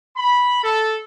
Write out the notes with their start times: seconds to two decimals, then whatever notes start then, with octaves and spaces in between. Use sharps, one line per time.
0.16 B5
0.63 A4